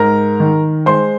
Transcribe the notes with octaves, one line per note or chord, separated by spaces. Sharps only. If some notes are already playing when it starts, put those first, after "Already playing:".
Already playing: G#2 A#4 A#5
D#3
G#3 C5 C6